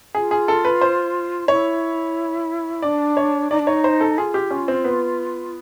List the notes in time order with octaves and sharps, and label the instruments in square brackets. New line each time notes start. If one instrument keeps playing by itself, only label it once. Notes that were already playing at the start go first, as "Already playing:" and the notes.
[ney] F4 [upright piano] G#4
[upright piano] G#4
A4
B4
C5
[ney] E4 [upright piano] C#5
[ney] D4 [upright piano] D5
[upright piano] C#5
[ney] D#4 [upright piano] D5
[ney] D4
[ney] D#4 [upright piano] C#5
[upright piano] C5
A4
[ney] F4 [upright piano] G#4
[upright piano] G4
C#4
C4
B3